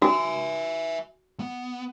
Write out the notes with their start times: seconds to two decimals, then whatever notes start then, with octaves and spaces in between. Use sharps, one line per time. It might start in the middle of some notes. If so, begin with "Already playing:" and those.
0.02 F#4 E5 G#5
1.40 B3